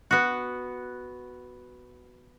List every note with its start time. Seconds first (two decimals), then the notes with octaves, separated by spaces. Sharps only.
0.11 B3 F#4